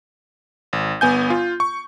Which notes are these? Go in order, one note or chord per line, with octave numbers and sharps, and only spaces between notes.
G#1
G1 B3 G#5 G6
F4
C#6